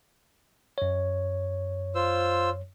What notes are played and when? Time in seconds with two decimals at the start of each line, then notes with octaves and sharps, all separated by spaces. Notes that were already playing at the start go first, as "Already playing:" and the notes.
0.78 F#2 C#5
1.95 F4 C5 E6